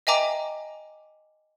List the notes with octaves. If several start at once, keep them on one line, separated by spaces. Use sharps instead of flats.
D#5 E5 G5 G#5 A#5 D6